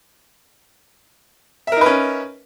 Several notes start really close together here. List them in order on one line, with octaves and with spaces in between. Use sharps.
E5 A#4 D#4 B4 C#4